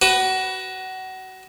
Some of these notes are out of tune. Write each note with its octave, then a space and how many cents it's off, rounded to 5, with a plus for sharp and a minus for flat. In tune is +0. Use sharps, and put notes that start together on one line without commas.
F#4 +25 B4 +0